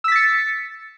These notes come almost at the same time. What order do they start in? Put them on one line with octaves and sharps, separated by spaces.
E6 B6 A6 C#7